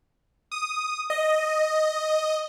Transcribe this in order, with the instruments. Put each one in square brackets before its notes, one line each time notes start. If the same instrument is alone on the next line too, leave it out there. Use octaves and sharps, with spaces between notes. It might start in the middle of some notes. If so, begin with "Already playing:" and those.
[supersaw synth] D#6
D#5